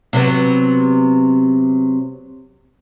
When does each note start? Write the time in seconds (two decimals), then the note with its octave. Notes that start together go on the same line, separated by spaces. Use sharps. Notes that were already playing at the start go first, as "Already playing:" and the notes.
0.13 C3 F#3 B3